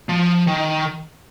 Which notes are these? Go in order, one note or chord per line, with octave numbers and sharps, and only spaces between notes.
F3
D#3